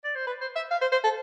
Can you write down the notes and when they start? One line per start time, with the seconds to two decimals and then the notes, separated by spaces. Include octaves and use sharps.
0.04 D5
0.15 C5
0.27 B4
0.41 C5
0.56 E5
0.71 F5
0.81 C5
0.92 C5
1.04 A4